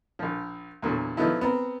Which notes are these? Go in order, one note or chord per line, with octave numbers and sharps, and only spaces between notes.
A#1 F3
E2 A#2 D3 F#3
F3 F#3 A3 B3 D#4 E4
B3 C4 A#4